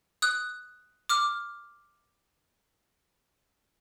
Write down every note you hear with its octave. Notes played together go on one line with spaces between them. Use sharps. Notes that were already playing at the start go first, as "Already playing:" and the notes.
D#6 F#6
D6 F6